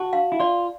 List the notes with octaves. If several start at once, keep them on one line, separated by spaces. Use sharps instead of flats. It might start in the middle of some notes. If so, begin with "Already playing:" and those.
Already playing: F#4 A5
F5
E4
F4 D5